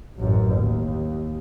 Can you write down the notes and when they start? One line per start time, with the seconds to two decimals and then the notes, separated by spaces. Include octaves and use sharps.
0.17 A1 F#2
0.54 D#2